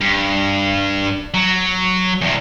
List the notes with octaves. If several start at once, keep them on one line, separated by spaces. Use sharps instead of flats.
G2
F#3
E2 C3